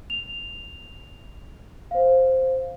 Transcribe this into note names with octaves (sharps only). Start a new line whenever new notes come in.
F7
C5 F5